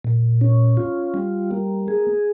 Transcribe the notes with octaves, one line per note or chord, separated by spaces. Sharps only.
A#2
C#4
F4
G3
A#3
G#4